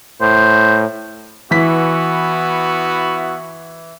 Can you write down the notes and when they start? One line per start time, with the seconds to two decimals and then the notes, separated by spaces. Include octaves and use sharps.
0.21 A2 C5
1.51 E3 B3 E4 F#4 B6